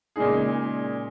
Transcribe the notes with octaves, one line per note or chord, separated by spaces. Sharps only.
A#2 C#3 G#3 D#4 G#4